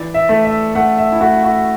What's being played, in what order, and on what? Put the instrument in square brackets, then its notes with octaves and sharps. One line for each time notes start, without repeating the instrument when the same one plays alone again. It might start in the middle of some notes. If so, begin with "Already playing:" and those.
Already playing: [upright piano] E3 D5
E5
A3
E5
A3 F#5
E5
E4
A3 F#4
F#4